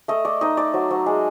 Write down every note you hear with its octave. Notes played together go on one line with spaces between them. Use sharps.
A3 D#5
A3 D5
D#4 D#5
A3 D5
F#3
F#3
G#3